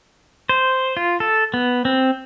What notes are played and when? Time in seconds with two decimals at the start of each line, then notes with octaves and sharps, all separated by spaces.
0.49 C5
0.97 F4
1.20 A4
1.54 B3
1.85 C4